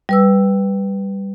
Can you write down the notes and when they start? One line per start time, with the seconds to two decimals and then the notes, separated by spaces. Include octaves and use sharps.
0.09 G3 B4 E6